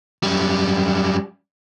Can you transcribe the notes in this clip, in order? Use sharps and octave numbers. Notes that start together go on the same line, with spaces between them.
F#2 G3